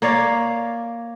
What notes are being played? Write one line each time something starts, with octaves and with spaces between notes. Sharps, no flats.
A#3 C#5 D5 F5